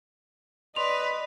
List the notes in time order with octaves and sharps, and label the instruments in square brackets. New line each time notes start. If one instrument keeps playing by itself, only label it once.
[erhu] B4 [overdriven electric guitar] D5 [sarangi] D#5 [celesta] C6 F7